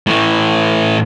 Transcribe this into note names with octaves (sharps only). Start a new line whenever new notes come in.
A2 E3